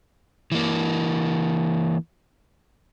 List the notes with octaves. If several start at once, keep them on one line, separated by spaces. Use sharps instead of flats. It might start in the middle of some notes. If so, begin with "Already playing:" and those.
E3 A#3